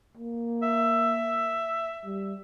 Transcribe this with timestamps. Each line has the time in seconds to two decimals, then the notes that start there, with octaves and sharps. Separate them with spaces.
0.17 A#3
0.63 E5
2.05 G3